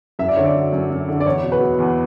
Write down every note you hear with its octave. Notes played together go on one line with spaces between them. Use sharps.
F#2 E5
D5
D3 C#5
D5
F#3
F#2
F#2
D3
D5
E2 C#5
B2
B4
F#3
E2